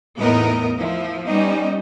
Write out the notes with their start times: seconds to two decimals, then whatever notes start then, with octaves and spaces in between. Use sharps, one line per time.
0.19 E2 A2 B3 D#4 A#4 D#5
0.76 F3 E4
1.28 G3 B3 C#4 D#4